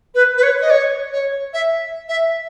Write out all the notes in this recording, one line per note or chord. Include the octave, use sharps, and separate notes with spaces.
B4
B4
C#5
D#5
C#5
C#5
E5
E5